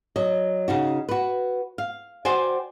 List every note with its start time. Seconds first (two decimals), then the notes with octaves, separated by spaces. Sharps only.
0.16 F#3 D#5
0.68 C#3 D#4 F#4
1.09 F#4 B4
1.78 F5
2.25 F#4 C5 D5 G5 G#5